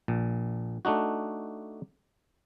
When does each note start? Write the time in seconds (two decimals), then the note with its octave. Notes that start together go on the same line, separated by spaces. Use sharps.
0.08 A#1 A#2
0.85 A3 D4 D#4 F#4